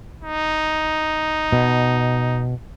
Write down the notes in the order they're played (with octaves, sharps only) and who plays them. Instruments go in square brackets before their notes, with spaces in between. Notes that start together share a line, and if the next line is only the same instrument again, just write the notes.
[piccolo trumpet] D#4
[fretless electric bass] B2